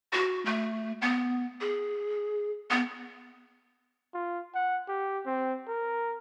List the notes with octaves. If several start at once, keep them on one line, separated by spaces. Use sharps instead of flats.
F#4
A3
B3
G#4
B3
F4
F#5
G4
C4
A#4